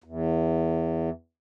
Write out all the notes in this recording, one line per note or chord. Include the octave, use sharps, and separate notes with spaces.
E2